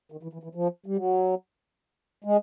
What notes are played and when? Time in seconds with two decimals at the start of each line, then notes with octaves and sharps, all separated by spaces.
0.12 D#3
0.23 E3
0.33 E3
0.43 E3
0.55 F3
0.86 G3
0.96 F#3
2.24 G#3